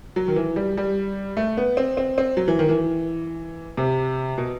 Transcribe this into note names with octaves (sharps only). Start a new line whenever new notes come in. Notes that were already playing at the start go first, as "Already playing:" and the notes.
F#3
D#3
E3
G3
G3
A3
B3
C4
C4
C4
F#3
E3
D#3
E3
C3
B2